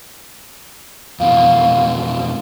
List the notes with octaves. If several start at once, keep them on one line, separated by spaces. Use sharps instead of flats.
F2 B2 E3 F5